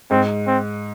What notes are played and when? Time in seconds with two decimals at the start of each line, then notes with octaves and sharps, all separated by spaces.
0.11 G#2 C4
0.47 C4